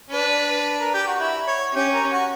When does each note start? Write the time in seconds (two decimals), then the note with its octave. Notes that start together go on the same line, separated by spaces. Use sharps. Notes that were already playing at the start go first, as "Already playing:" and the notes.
0.10 D4 B4
0.80 A#4
0.94 G4
1.07 F#4
1.20 E4
1.47 C#5
1.75 C#4 G4
1.93 A#4
2.12 F#4